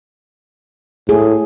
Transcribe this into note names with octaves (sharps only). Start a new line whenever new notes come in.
A2 G#4